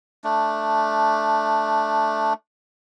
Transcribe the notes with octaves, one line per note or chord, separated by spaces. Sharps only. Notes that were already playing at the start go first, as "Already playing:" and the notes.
A3 D4